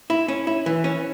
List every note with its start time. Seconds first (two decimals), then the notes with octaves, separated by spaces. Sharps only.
0.10 E4
0.28 C#4
0.47 E4
0.66 E3
0.84 C#4